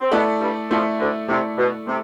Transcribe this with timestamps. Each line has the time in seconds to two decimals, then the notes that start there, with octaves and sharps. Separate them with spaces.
0.01 C4
0.12 B2 A3 B3 E4 A4 D5
0.41 G2 G3
0.70 F2 F3 A3 E4 A4 D5
0.99 D2 D3
1.28 C3 A3 E4 A4 D5
1.58 B2
1.87 C3 A3